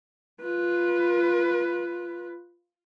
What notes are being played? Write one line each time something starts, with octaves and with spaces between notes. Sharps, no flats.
F4 B4